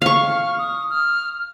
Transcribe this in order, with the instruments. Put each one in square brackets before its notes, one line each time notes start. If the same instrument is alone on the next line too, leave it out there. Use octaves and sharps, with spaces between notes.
[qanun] F5 C#6 [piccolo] F6
[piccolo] D#6
F6